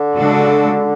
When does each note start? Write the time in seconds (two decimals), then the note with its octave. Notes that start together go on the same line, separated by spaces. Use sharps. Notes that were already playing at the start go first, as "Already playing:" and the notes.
Already playing: D3
0.16 C#3 G#3 D4 F#4 A4